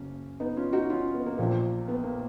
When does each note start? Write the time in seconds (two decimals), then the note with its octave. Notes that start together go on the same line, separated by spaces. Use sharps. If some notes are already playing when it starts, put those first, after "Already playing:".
Already playing: F#1 A#3 C#4
0.40 B3 D#4
0.57 C#4 F4
0.73 D#4 F#4
0.89 C#4 F4
1.14 B3
1.26 A#3
1.38 A#1 A#2 F3 A#3
1.88 B3
2.04 A#3